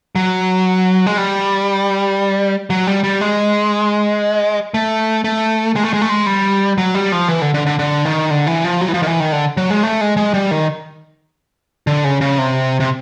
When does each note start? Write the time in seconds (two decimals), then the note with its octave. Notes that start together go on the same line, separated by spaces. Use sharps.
0.15 F#3
1.06 G#3
1.17 G3
2.70 F#3
2.87 G3
3.04 G3
3.21 G#3
4.74 A3
5.24 A3
5.76 G#3
5.84 A3
5.93 G#3
6.02 A3
6.09 G#3
6.26 G3
6.78 F#3
6.95 G3
7.12 F3
7.28 E3
7.42 D3
7.54 D3
7.66 D3
7.79 D3
8.05 D#3
8.30 D3
8.47 E3
8.64 F3
8.81 F#3
8.89 E3
8.94 F3
9.02 D#3
9.07 E3
9.20 D#3
9.32 D3
9.57 F#3
9.70 G#3
9.83 A3
10.01 G#3
10.17 G#3
10.34 G3
10.51 D#3
11.87 D3
12.04 C#3
12.21 C#3
12.38 C3
12.80 C3